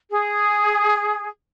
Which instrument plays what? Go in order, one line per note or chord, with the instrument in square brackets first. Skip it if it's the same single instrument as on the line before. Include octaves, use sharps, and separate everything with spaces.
[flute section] G#4